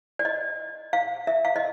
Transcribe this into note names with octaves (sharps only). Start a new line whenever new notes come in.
D5
D#5
F5
E5
F5
D#5